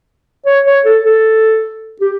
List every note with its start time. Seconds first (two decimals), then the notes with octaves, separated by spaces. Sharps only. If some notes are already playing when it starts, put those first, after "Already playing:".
0.46 C#5
0.66 C#5
0.85 A4
1.05 A4
2.01 G4